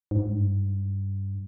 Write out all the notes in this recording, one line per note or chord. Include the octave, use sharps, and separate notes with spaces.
G#2
G2